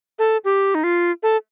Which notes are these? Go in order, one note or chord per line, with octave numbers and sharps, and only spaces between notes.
A4
G4
D#4
F4
A4